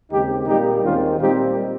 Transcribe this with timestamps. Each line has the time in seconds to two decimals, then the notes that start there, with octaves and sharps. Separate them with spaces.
0.11 D#2 C#3 G#3 C4 D#4 G4
0.47 A#2 G3 A#3 D#4 G4
0.83 D#2 D#3 G#3 C4 C#4 F4
1.20 A#2 G3 C4 D#4 G4